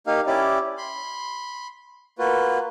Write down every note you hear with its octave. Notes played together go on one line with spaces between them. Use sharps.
A#3 D#4 G4 F5
C#4 E4 G4 D5
B5 C6
A#3 F4 F#4 B4